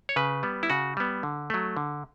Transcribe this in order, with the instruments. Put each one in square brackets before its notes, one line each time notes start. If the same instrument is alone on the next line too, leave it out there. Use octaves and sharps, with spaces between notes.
[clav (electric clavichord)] C#5
C#3 B4
G3 B3
E4
C#3 F#4
G3 B3
D3
F#3 A3
D3